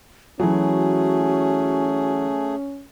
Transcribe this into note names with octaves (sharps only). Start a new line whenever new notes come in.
E3 F#3 A3 C#4 F#4 G#4